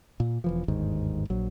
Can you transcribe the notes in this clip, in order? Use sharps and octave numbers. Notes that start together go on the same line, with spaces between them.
A#2
E1 E3 F3
G1 D#2 G#2 D#3
A#1 F#3